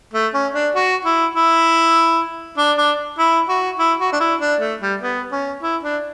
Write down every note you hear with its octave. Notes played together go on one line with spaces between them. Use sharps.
A3
C#4
D4
F#4
E4
E4
D4
D4
E4
F#4
E4
F#4
D4
E4
D4
A3
G3
B3
C#4
E4
D4